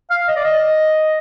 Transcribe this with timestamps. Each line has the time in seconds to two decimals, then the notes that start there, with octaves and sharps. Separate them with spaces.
0.10 F5
0.28 D#5
0.36 D5
0.45 D#5